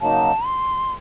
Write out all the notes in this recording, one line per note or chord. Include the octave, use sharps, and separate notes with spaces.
C#3 F#3 A#3 D#4 A5
C6